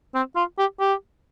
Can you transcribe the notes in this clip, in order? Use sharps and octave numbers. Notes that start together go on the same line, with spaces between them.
C4
F4
G4
G4